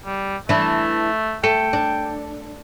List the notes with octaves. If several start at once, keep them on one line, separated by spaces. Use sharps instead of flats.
G3
E3 A3 D4 B5
A3 A4 G5
D4